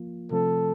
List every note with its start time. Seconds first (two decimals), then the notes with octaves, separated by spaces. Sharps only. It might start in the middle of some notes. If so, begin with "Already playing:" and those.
Already playing: F3 A#3 F4
0.31 C3 F3 A3 C4 A4